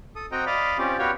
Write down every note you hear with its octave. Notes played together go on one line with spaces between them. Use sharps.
A4 D#6
C4 F#4 D#5 G5 A#5
D5 D#5 F5 B5
C4 C#4 F4 G4 D5
B3 F#4 G4 C#5 F5 G5